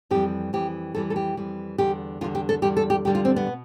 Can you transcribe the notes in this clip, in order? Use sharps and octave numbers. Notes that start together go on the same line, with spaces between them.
F2 E3 G3 G4
F2 E3 G3 G4
F2 E3 G3 A4
A4
G4
F2 E3 G3
E2 D3 G3 G4
E2 D3 G3 F4
G4
A4
E2 D3 G3 G4
A4
G4
E2 D3 G3 G4
F4
C4
B3
B2